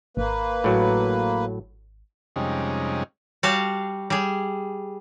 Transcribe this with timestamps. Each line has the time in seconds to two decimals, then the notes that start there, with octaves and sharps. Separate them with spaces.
0.17 G#1 A#3 B4
0.64 A2 F#3
2.36 F2 C3 G3 G#3 C#4 D#4
3.43 G3 F#4 F5 A5
4.10 G3 G#4